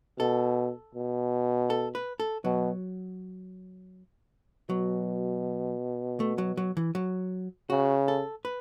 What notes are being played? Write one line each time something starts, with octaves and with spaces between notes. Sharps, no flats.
B2 A4
B2
A4
B4
A4
B2 F#3
B2 F#3
A3
F#3
F#3
E3
F#3
C#3 F#4
A4
B4